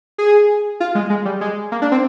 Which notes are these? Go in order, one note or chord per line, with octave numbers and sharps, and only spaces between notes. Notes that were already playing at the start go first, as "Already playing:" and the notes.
G#4
F4
G#3
G#3
G3
G#3
A#3
D4
C4